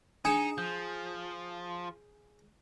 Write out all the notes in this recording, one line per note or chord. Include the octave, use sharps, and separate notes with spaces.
D4 D#4 G#4 G#5 C#7 E7
F3 G6